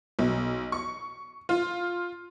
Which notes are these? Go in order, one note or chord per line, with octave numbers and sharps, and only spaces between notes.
B1
C#6
F4